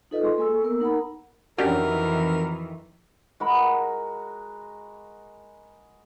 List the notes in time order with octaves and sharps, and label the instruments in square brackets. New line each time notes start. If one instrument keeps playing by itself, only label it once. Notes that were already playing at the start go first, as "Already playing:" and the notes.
[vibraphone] D#4 F4 A4 B4 D#5
G#3 G#4 C6 C#6
A#3 A4 G#5 C#6 E6
A#3 B3 A#4 E6
D#4 A#4 F#5 A#5 B5
[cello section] F2 D#3 E3 [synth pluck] C#4 D4 G4 [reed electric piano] F#4 [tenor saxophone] A#4
[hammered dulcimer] G#3 F#4 A#4 B5